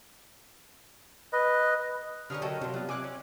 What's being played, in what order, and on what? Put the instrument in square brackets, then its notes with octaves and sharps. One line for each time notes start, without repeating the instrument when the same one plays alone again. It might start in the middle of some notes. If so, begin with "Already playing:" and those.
[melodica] B4 D#5
[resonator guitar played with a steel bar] D3 [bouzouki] G3 C#4 A#4 [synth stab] C#6 D#6 F6
[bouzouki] F#3 A4 [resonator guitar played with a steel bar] A#4 D#5 A5 [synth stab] G5
[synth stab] C3 [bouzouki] F#3 F4
[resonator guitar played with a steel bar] F#3 B3 F4 [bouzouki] G3
[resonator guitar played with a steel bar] C3 [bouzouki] E3 [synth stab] G#5 D6 F#6
[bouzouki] C#4